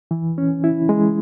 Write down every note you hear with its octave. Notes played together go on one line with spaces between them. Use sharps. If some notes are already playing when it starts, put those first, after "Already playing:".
E3
C#4
E4
G#3